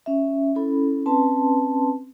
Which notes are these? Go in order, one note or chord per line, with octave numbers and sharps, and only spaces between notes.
C#4 E5
C#4 E4 A4 B5
C4 C#4 B4 A5 C6